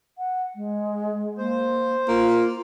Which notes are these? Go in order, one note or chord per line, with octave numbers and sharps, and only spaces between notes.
F#5
G#3
A#3 C5
A#3 F4